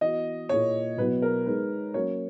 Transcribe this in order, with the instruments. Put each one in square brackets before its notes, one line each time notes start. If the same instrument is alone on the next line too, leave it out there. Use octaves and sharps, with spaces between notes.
[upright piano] E3 B3 F#4 [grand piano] D#5
[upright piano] A#2 A#3 E4 G#4 [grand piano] C#5
[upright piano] B2 F#3 B3 E4 [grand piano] B4
[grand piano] A#4
[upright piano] G#3 D#4 G#4 [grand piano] B4
[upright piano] F#3 A#3 C#4 F#4 A#4 [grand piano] C#5